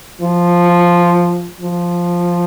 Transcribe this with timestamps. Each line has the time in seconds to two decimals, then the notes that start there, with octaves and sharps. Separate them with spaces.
0.22 F3
1.60 F3